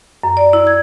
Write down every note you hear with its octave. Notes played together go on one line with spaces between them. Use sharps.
F#2
D5
E4
G#6